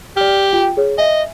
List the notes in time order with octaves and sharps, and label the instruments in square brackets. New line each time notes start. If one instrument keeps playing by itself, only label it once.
[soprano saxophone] G4 [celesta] D5 F6
[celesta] F4 G5
G#4 C#5
[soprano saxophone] D#5 [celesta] E5 G#5